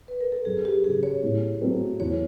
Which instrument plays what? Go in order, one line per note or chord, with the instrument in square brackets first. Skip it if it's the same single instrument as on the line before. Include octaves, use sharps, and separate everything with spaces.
[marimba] B4
A#4
A4
[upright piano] F#2 [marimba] G#4
[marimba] G4
[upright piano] C#3 F#3 [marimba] G#4
[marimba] C#5
[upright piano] A2
F#3 A3 C4
[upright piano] E2 [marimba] C#5